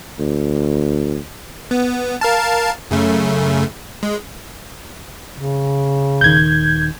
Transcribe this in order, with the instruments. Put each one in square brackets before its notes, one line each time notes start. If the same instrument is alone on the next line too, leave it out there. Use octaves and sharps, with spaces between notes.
[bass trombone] D2
[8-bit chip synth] B3
A#4 F5 A5
F#2 C#3 A3
G#3
[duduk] C#3
[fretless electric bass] D#1 D#3 [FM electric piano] G6 G#6